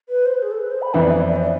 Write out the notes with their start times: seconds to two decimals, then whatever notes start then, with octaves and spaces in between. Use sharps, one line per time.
0.09 B4
0.26 C5
0.34 B4
0.42 G#4
0.51 A4
0.60 B4
0.71 C5
0.82 B5
0.94 F2 E3 B3 E5
1.02 D5
1.10 E5
1.28 D5
1.36 C5
1.44 D5